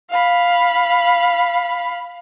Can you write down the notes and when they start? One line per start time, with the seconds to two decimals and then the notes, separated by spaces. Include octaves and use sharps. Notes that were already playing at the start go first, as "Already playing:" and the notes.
0.10 F5 B5